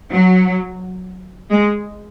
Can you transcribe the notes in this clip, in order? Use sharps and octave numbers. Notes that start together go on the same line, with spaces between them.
F#3
G#3